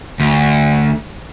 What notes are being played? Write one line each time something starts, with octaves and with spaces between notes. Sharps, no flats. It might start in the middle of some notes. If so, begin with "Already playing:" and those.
D2